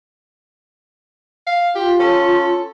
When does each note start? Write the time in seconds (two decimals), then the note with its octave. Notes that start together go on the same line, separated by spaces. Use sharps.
1.47 F5
1.75 F4 G4
2.00 C#4 A4